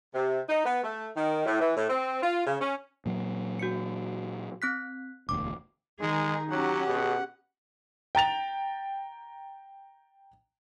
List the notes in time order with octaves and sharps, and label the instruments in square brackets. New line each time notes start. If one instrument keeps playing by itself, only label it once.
[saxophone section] C3
D#4
B3
A3
D#3
A2
E3
A2
C4
F4
C#3
C#4
[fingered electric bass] A#2 F#3
[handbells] F#4 C#7
C4 F#6 B6
[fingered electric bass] E1 D2 [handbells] D6
[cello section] D#3 G#4 [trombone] G#3 [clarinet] D#4
[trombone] F#3 [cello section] C#4 G4 [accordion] F#5
[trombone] B2 [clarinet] G#4
[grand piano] G5 A#5 A6 F7